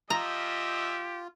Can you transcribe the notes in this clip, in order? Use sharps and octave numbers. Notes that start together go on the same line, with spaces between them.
F3 F4 G4 D#5 E5 A#5